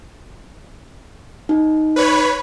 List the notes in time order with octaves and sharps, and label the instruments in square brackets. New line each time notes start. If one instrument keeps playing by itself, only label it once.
[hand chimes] D#4
[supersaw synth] B4 C#5 B5